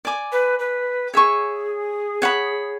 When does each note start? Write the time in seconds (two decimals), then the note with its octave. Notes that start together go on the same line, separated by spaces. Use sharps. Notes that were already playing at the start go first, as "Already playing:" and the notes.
0.05 D5 G#5 D6
0.32 B4
0.59 B4
1.13 G#4 C#5 E5 G#5 C#6
2.22 C#5 F#5 B5